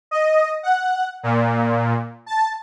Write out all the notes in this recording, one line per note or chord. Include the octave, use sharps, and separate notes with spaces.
D#5
F#5
A#2
A5